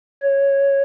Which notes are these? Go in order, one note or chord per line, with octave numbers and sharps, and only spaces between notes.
C#5